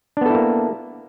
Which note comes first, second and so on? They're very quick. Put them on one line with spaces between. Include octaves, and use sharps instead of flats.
D4 B3 A4 E4 A#3